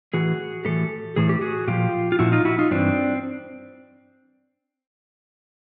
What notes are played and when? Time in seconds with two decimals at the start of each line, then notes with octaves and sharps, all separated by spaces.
0.14 A2 E3 F#4 G#4
0.65 A2 E3 G4 A4
1.16 A2 E3 G#4
1.29 G4
1.41 F#4 G#4
1.68 A#2 F3 F4 G4
2.12 F4
2.19 A#2 F3 E4 F#4
2.32 D#4 F4
2.45 E4 F#4
2.59 D#4 F4
2.71 G2 E3 C4 D4